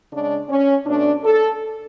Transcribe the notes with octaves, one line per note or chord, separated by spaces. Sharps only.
C#3 G#3 D4
C#4
B2 A3 D4
A4